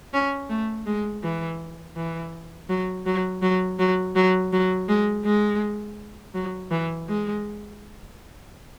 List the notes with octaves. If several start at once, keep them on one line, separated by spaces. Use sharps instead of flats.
C#4
A3
G#3
E3
E3
F#3
F#3
F#3
F#3
F#3
F#3
G#3
G#3
F#3
E3
G#3